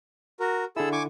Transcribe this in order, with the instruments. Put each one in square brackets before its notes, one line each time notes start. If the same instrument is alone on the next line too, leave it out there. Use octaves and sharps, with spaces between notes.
[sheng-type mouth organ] F#4 A#4
[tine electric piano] D3 E4 [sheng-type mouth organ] G#4 A4 E6
[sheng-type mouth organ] G#5 C#6 D6